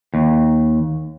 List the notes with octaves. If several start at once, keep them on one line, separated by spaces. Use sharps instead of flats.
D#2